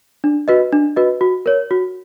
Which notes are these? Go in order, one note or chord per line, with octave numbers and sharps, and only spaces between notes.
D4
F#4 B4 D#5
D4
F#4 B4 D#5
F#4
A#4 C#5
F#4